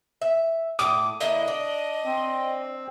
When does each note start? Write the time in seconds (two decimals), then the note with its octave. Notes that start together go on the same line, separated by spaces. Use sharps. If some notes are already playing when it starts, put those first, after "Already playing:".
0.22 E5
0.79 A2 D6 D#6
1.20 D3 A#3 E4 D#5
1.48 D4
2.06 C4